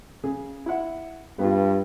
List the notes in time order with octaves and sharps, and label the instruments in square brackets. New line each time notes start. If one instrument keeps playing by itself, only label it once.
[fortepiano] C#3 G#4
E4 F#5
[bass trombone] G2 [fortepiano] B3 F4